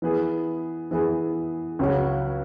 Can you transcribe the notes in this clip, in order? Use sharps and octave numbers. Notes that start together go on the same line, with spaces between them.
E3 B3 G#4 B4
E3 B3 G#4 B4
C#2 C#3 F#3 C#4 F#4